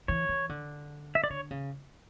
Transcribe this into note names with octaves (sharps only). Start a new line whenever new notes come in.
E3 C#5
E3
D3
E5
D5
D3 C#5
C#3